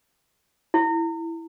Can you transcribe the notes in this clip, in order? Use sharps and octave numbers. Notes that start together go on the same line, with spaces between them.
E4